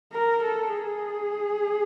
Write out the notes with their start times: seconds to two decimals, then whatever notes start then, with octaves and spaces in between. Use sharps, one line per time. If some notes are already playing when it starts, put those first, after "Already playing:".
0.12 A#4
0.43 A4
0.73 G#4